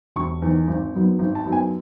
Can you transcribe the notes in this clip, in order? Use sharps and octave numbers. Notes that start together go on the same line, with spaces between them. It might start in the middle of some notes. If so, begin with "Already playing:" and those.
E1 C#6
E2 D#3
G#1
F#2 D#3 F#3 B3
G#1
A5
F#2 D#3 F#3 B3
G#5